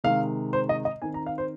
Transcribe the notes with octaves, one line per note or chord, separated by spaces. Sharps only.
C3 D#3 G#3 F5
C5
D#5
D#5
D#3 C4 D#4 G#5
A#5
F5
C5